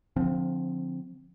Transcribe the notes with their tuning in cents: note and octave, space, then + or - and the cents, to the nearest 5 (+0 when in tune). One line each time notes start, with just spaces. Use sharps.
D3 +0 F3 +20 C4 +0